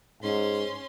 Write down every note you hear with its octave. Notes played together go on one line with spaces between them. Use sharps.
G#2 C#4 C6